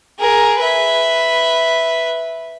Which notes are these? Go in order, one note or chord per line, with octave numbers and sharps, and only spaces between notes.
G#4 A#4
B4 E5